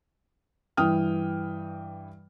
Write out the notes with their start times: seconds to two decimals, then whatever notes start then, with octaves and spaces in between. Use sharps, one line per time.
0.77 G2 E3 G5 D#6 F6